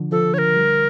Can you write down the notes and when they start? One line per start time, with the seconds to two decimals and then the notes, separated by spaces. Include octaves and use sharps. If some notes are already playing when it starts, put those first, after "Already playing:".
Already playing: D3 F3
0.12 F3 A4
0.34 D3 C#5
0.38 A#4
0.56 G3